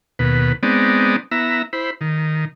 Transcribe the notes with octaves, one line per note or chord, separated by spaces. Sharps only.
D#2 B2 B4
G#3 B3 C4 D#4 D5
B3 E4 E5 A#5
E4 C5 B5
D#3